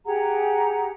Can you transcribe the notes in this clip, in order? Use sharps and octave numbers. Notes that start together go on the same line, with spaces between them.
G4 G#4 F#5 A#5